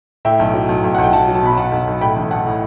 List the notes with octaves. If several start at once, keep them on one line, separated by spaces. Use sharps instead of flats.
A2 E5 G5
B1
F#3
B1
B1
B1 F#5
G5
F#3 F#5 A5
F#3
A5
B2 B5
B2 F#5 A5
B1
B1
A2 G5 B5
A1
A2 F#5 A5
A2